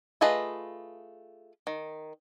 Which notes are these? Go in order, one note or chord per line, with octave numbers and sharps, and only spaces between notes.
A3 F4 G#4 B4 D#5
D#3